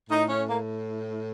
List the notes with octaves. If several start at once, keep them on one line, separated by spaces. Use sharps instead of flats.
A2 D#4
C#4
A#3